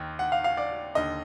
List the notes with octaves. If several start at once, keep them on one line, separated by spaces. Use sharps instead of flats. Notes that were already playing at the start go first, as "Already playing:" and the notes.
Already playing: D#2 D#3
F#5
F5
F5
D5
D#2 D3 D#5